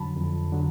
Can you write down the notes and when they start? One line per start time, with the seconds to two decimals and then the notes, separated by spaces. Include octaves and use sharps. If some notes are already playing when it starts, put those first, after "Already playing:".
Already playing: F2 D3 F#3 A5 B5
0.17 F2
0.52 D3 F#3